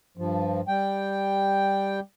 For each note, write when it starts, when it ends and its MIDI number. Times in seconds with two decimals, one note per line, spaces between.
0.17 0.61 43
0.17 0.61 53
0.68 2.00 55
0.68 2.00 79